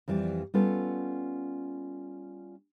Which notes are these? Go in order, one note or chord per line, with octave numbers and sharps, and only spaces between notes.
F2 E3 G3 D5
G3 B3 C#4 F4 A4